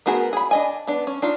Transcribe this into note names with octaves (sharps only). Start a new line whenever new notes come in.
A3 B3 F#4 G#4 A#4
G#4 B5
D4 D#5 G#5
B3 D4
C#4
D4 D#4 F4